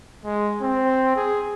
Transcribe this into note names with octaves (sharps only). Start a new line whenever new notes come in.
G#3
C4
G#4